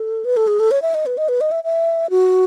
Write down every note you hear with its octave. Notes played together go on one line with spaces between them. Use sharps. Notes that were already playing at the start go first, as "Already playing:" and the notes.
Already playing: A4
B4
A4
G#4
A4
C#5
E5
D#5
B4
D#5
B4
D#5
E5
E5
F#4